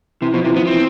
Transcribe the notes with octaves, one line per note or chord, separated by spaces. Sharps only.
C3 E3
B2 F3
C3 E3
F3 B3
E3 C4